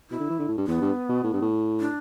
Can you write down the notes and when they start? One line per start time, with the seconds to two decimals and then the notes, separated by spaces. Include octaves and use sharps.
0.10 B2 E4
0.19 D3
0.30 E3
0.39 D3
0.48 A2
0.58 G2
0.67 E2 B3
0.81 G2
1.09 B2
1.24 A2
1.33 G2
1.41 A2
1.80 D4